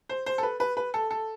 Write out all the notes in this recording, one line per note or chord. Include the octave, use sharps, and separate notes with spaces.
C5
C5
A4
B4
B4
B4
A4
A4